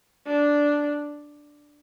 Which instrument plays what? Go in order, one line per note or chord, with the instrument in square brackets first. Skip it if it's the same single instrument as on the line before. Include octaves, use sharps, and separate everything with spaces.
[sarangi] D4